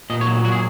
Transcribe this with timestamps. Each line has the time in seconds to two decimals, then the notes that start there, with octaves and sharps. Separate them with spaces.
0.10 A#2 D#5
0.21 C#5
0.27 F#3
0.44 A#2 F#4
0.52 G#4